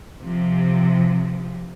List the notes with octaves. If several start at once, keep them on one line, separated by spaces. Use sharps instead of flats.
C3 F3